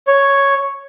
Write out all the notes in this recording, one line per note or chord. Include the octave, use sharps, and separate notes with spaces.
C#5